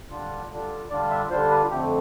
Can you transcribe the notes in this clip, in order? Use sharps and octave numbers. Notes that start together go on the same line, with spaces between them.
D3 G3 D4 F4
D3 G3 D4 F4
D3 G3 D4 F4 D5
E5
D3 G3 D4 F4 C5
B4
F2 D3 A3 G4